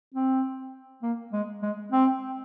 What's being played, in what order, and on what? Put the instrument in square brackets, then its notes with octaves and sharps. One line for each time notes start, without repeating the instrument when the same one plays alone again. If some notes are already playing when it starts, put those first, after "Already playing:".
[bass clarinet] C4
A#3
G#3
G#3
C4